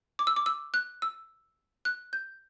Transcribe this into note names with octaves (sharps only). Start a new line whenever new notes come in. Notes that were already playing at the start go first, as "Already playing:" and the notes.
D6
E6
D6
E6
F#6
E6
F#6
G6